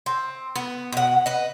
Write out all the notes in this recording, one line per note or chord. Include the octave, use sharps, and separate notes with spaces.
C4
B3
B2 F#5
B4 D#5